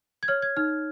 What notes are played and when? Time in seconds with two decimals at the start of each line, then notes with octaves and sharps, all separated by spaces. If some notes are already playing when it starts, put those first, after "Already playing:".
0.23 G#6
0.28 C#5 F6
0.42 G#6
0.57 D#4 F6